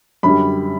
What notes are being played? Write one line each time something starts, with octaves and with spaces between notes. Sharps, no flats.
F#2 D3 G3 B5